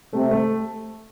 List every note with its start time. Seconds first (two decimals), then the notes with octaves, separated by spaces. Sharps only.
0.13 C3 A3
0.31 A3